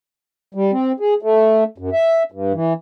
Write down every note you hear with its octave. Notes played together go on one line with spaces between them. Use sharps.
G3
C4
G#4
A3
F#2
E5
G2
E3